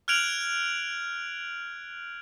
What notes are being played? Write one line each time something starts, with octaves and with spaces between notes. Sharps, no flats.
F6 F#6 G#6 D7 F7 F#7